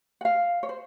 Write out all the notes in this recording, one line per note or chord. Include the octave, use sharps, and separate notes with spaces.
F#5
F5
C#5
C5